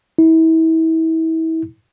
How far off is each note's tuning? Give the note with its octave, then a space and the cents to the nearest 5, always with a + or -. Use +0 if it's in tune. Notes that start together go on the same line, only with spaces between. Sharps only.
E4 -35